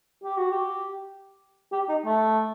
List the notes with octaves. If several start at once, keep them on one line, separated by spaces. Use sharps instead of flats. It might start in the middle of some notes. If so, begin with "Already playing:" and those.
G4
F#4
G4
G4
D#4
A3